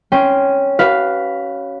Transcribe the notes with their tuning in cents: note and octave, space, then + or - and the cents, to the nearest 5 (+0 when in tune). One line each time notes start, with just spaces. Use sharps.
C#4 +0 G5 +0 C6 +0
F#4 +40 B4 +0 F5 +0